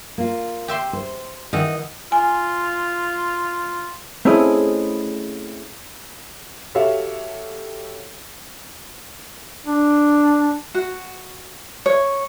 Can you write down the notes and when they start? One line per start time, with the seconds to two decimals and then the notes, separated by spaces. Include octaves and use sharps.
0.18 A#3 F4
0.68 G4 E5 C6
0.93 C5
1.53 D#3 E3 D#5 F#5
2.12 F4 G#5
4.25 A3 C4 C#4 E4 G#4 D#5
6.75 F#4 G4 A4 C#5 E5 F5
9.66 D4
10.74 F#4
11.86 C#5